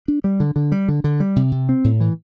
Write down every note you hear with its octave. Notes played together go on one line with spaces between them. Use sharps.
D4
G3
D3
D3
G3
D3
D3
G3
C3
C3
C4
A2
E3